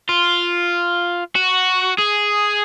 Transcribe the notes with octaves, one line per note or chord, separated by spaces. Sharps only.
F4
F#4
G#4